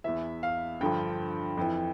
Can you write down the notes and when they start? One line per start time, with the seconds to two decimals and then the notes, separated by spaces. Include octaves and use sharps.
0.04 E2 E3 E5
0.43 F5
0.81 G2 D3 F3 G5
1.57 F2 E3